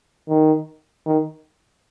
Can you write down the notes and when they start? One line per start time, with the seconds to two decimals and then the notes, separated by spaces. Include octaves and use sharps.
0.29 D#3
1.06 D#3